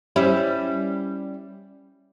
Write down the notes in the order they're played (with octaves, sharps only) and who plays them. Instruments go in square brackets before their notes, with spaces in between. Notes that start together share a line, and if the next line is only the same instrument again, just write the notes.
[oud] G3 C#4 E4